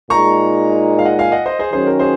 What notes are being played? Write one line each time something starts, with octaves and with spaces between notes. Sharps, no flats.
A#2 G#3 D#4 A#5 C#6
F5
D#5 F#5
F5 G#5
D#5 F#5
C5 D#5
G#4 C5
D#3 F#3 C#4 G#4 C5
A#4
G#4 C5